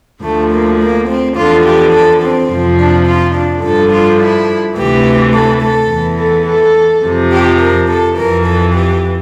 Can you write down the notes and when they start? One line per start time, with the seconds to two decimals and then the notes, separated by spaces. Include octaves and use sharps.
0.22 D2 D3 F3 A3
0.51 A#3
0.79 A#3
1.07 C4
1.36 E2 D3 F3 F4
1.64 G4
1.93 A4
2.21 C4
2.49 F2 C3 F3
2.78 D4
3.06 F4
3.34 D4
3.63 G2 D3 F3 A4
3.91 F4
4.19 E4
4.76 D2 C3 E3 G4
5.33 A4
5.61 A4
5.90 E2 E3
6.18 A4
6.46 A4
7.04 F2 C3 F3
7.32 G4
7.60 A#4
7.88 A4
8.16 F2 E3 A#4
8.45 A4
8.73 G4